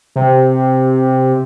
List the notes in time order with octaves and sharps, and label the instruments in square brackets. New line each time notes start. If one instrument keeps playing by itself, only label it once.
[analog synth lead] C3